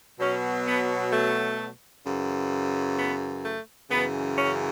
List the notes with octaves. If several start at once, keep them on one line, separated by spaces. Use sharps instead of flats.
B2 F#3 C#4
B3
A3
F#2 C#3 E3
B3
A3
F#2 C#3 E3 B3
C#4